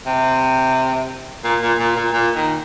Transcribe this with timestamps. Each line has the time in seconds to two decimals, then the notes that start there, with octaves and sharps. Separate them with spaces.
0.06 C3
1.44 A#2
1.62 A#2
1.79 A#2
1.96 A#2
2.13 A#2
2.36 D#3